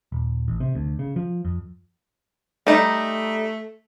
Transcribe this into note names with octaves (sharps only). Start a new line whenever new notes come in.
D#1
A1
C3
D2
C#3
F3
F2
G3 A3 D#4